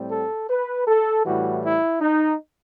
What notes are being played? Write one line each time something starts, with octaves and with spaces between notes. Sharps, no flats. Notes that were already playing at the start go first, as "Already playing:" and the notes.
Already playing: A2 G3 C4
A4
B4
A4
A2 E3 G3 F#4
E4
D#4